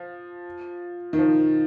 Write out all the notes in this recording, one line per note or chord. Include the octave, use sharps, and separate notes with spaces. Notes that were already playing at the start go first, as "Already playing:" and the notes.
Already playing: F3
D#3
F3